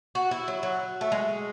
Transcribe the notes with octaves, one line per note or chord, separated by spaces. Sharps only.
F#4
E4
F#3
F#3
A3
G#3